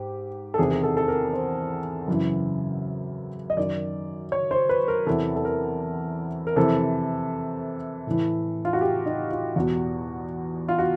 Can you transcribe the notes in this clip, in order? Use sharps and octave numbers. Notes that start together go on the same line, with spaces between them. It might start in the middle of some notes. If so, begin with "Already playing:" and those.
Already playing: G#2 G4
A4
E2 C3 D#3 G#4
G#4
A4
A4
A#4
C5
F#2 C#3 E3
D#5
F#2 D#3 D5
C#5
C5
B4
A#4
E2 C3 E3 A4
A4
A#4
A#4
F2 C3 E3 A4
A2 E3
F4
F#4
G4
D#4
F4
E2 B2 F#4
F4
F#4